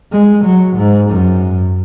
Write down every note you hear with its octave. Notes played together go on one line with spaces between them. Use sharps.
G#3
F#3
G#2
F#2